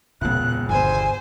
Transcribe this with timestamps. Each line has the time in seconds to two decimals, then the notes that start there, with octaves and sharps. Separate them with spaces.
0.21 E1 C#2 A#2 B3 F#6
0.69 G1 C5 G#5